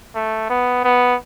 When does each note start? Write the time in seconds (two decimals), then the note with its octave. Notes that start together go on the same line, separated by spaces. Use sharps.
0.15 A3
0.50 B3
0.84 B3